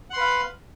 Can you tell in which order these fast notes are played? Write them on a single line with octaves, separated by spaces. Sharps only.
F#5 C6 B4 F5